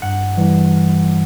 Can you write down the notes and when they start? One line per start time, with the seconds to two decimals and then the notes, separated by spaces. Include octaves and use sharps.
0.02 G2 F#5
0.37 E3 G3